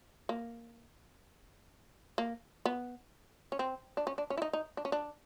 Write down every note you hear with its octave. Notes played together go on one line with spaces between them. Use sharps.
A#3
A#3
B3
C#4
C4
D4
C#4
D4
C#4
E4
D#4
D#4
D4
C#4
D4